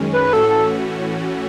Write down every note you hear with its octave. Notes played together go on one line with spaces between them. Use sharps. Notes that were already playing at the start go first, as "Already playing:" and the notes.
Already playing: F#2 D#3 G#3 C#4
B4
A2 E3 A3 C#4 F#4 A4
A4